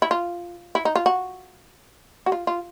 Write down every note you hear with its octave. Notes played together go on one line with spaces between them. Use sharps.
E4
F4
E4
D#4
F4
F#4
F#4
F4
F4